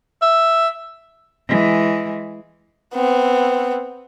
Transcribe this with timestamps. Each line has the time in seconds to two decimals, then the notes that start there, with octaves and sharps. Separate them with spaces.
0.22 E5
1.48 E3 G#3
2.94 B3 C4